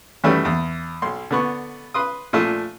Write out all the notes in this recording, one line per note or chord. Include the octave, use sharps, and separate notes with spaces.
F#2 D#3 E3 G3 A3 C#4
E2
B1 C6
D3 B3 C#6
B4 C6 D#6
A#2 F3 A3 D4